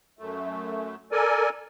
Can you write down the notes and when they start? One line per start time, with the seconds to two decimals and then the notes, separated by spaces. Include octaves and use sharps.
0.19 F#2 A3
1.12 A4 A#4 D5 G#5